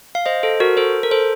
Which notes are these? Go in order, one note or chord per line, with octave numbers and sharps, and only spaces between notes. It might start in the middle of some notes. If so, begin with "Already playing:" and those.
F5
C5 D#5
A4 C5
F#4 A#4
A4 C5
A#4
A4 C5